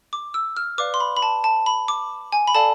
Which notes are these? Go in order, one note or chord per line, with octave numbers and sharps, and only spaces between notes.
D6
E6
F6
B4 D5 F5 D6
C6
B5
B5
A5
A5
B5
D6
G#5
B5
A4 D5 F5 A5